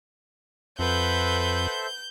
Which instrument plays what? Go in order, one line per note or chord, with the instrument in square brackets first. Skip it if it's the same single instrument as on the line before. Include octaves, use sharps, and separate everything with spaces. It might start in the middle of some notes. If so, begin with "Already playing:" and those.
[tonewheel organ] F2 [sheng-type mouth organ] A4 C5 E5 [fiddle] B4 F#5 [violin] G6